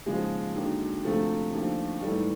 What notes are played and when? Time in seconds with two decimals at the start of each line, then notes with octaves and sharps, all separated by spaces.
0.06 D#2 C#3 F3 G#3
0.55 D#2 D3 F#3
1.05 D2 C3 F3 A3
1.53 D#2 D3 F3
2.02 G#2 E3 G3 A3